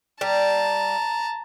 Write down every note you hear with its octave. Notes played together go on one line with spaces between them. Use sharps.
G3 A5 A#5